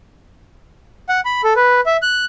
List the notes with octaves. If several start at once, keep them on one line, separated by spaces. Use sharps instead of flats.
F#5
B5
A4
B4
E5
F#6